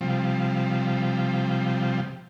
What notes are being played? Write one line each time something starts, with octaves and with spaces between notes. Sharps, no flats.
C3 F3 G3